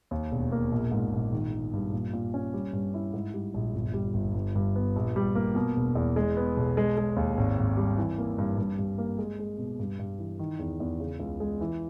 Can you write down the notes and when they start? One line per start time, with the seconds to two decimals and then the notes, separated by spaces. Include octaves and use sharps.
0.11 D#2
0.32 E1
0.52 A#3
0.72 A#1
0.92 G#2
1.13 A#1
1.32 D#3
1.53 D#3
1.73 G2
1.93 A#2
2.13 A#2
2.34 C#4
2.54 G3
2.73 G2
2.94 E4
3.14 G#2
3.34 G3
3.54 A#1
3.75 G1
3.94 G3
4.14 G1
4.34 G2
4.55 G2
4.76 B3
4.96 A#1
5.16 G3
5.35 A#3
5.55 B2
5.76 E1
5.95 E2
6.16 G#3
6.37 B3
6.57 B1
6.77 G#3
6.97 G#3
7.16 D#2
7.37 G#1
7.58 G#1
7.77 G3
7.98 E3
8.18 A#3
8.38 G2
8.57 G2
8.79 G2
8.98 A#3
9.18 G#3
9.39 G#3
9.58 B2
9.79 G2
9.99 G2
10.19 E3
10.39 D#3
10.59 E2
10.80 E2
11.00 C#3
11.20 C#2
11.40 G#3
11.61 E3